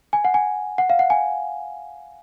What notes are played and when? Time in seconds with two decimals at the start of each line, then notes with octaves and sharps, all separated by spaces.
0.13 G#5
0.25 F#5
0.34 G#5
0.78 F#5
0.90 F5
0.99 F#5
1.10 G#5